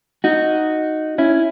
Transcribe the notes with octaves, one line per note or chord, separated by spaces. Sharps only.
D#4 F#4
C#4 E4